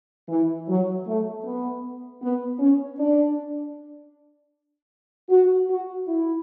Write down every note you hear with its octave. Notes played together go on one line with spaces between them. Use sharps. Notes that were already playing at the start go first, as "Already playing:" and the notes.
E3
F#3
A3
B3
B3
C#4
D4
F#4
F#4
E4